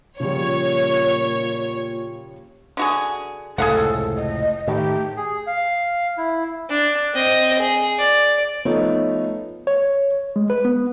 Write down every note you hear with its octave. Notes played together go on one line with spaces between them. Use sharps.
A#2 C#3 F3 G3 C#5
D3 F#4 G#4
F1 C#2 A2 G#4 A4 F5 F#5
D#5
A2 D#3 G4
G#4
F5
E4
D4
C4 D#5
G#4
D5
F3 A3 B3 D#4 C#5
C#5
G#3
B4
B3